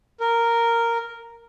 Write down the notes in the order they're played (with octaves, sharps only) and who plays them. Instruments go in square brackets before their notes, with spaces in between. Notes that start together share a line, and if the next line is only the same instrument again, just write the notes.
[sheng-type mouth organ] A#4